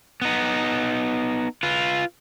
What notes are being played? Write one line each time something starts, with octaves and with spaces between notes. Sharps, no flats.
B3 D#4
F4 B4